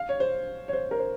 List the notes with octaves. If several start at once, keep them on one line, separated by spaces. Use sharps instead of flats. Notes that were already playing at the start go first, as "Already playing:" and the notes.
Already playing: F5
C#5
C5
C#5
C5
A#4
C5